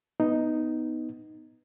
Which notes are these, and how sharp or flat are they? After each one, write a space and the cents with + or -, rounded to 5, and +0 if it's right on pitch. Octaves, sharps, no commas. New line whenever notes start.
B3 +0 D#4 +0